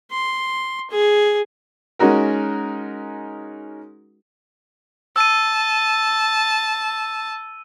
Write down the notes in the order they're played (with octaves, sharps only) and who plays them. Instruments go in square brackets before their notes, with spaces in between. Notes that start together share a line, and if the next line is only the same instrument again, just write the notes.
[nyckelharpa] C6
G#4
[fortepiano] G#3 C#4 D#4 F#4 A#4
[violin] A5 [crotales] E6 D#7